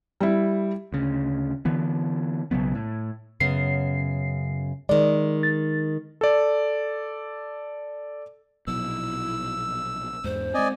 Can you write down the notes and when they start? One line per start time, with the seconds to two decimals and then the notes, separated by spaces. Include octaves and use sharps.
0.21 G3 E4
0.93 D2 C#3
1.65 D3 E3 B3
2.51 B1 C#3 F#3 B3
2.75 A2
3.40 F#2 C#3 B3 C7
4.89 D#3 G#3 D5
5.43 A6
6.21 A4 D5
8.67 A#1 B2 F#3 E4 E6
10.24 E2 G#2 C5
10.54 G#3 C4 D5 D#5 G#5